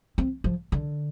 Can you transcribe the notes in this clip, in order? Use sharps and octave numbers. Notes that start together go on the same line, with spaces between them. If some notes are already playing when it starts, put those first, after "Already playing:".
C4
F3
D3